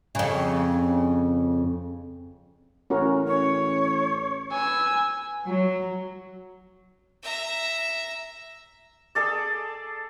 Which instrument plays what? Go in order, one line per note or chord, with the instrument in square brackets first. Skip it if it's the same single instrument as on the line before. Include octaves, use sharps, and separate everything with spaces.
[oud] F2 C#3
[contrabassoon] A1 [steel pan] C#4 F#4 A#4
[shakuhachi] C#5
[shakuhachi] B4 [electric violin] G#5 E6
[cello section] F#3
[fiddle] E5 A#5
[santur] G#4 A4 D5